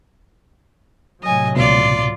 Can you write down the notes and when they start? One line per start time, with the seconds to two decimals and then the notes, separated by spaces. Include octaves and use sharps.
1.23 A2 C3 F#3 D#5 G#5
1.56 C#2 B2 F4 D5 C6